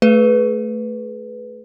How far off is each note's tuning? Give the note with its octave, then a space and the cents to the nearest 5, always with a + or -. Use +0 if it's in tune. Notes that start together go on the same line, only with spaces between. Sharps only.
A3 +0 G#4 +35 B4 +0